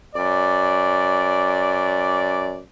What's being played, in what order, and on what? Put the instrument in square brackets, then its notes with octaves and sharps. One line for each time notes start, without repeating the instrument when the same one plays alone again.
[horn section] F#2 D5